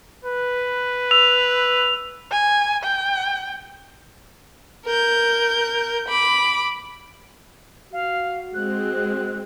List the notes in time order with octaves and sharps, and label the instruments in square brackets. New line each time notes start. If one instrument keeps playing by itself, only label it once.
[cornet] B4
[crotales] E6 F7
[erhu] G#5
G5
[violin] A#4 G6
B5 D6
[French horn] F#4 [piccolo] F5
[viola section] G#3 C4 [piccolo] F#6